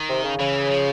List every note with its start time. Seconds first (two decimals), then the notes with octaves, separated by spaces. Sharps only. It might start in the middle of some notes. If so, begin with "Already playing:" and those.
Already playing: D#3
0.09 C3
0.23 C#3
0.39 C#3 E3
0.70 F3